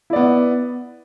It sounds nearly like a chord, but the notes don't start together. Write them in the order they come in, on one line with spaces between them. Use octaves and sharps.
E4 D5 B3